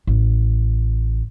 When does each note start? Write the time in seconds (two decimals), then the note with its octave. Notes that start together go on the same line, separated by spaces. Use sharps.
0.07 A1